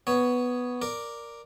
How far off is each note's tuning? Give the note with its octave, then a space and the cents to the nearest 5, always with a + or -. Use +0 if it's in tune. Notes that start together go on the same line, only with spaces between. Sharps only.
B3 +0 C#5 +10
A#4 +0 D5 +0